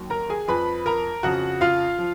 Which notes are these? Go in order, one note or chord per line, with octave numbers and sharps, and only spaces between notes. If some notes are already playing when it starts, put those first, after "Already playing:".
Already playing: D#2 D#3 F#3
A#4 A#5
G#4 G#5
F2 F3 B4 B5
A#4 A#5
F2 C#3 F3 F#4 F#5
F4 F5
F3